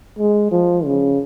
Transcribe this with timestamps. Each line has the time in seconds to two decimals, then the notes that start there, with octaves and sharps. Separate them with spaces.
0.19 G#3
0.51 F3
0.85 C#3